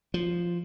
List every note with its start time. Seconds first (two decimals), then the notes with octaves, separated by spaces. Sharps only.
0.14 F3